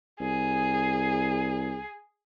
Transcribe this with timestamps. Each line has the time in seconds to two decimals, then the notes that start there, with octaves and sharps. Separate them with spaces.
0.20 C2 G#4